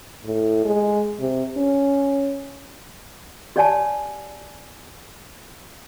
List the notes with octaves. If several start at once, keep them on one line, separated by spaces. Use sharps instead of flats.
A2
G#3
C3
C#4
G4 C#5 D5 F#5 G#5 A5